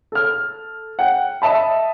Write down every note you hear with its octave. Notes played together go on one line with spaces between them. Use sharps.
A4 F6
F#5 G5
D#5 E5 A5 B5